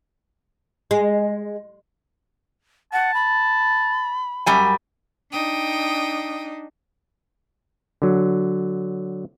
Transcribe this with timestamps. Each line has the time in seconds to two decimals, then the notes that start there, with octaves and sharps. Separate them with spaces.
0.91 G#3
2.93 F#5 A5
3.14 B5
4.46 F#2 G3 G#5
5.32 D4 D#4 G5 D#6
8.02 D3 F#3